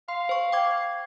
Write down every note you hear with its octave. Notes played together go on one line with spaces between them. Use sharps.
F5 C6
C5 C#6
G5 D6 G#6